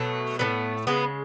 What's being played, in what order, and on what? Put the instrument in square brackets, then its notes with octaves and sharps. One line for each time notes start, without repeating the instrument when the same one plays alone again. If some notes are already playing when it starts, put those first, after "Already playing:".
Already playing: [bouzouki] B2 F#3 A3
A2 E3 A3 B3
C#3 G#3 B3